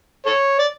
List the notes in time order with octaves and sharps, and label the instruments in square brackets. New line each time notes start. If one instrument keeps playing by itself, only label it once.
[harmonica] A4 C#5
D5